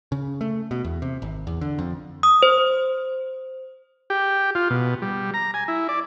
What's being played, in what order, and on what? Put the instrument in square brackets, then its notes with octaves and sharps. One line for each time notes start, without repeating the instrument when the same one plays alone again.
[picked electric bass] C#3
A3
B2
E2
C3
G#1
E2
D3
F2
[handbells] D#6
C5
[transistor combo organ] G4
F4
B2
G3
A#5
G#5
E4
D5